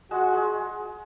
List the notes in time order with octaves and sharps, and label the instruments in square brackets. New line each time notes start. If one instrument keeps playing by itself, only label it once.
[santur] G#3 [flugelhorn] F#4
[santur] G#3